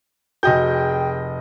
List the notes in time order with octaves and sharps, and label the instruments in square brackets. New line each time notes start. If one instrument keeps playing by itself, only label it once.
[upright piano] F1 D#5 G6 [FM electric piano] F#4 G#4 G5